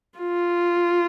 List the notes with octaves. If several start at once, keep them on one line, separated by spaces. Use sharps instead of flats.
F4